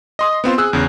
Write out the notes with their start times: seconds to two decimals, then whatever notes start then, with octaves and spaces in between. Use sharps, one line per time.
0.19 D#5 C6 D#6
0.44 B3 C4 F4 C5
0.58 G#4 E6 F#6
0.73 E2 C#3